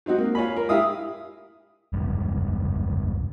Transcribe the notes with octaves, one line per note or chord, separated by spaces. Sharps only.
F#3 C4 D#4 F#4
A#3
F4 C#5 G#5 B5
A#4
E4 G4 E5 F5 D#6
F1 C#2 G2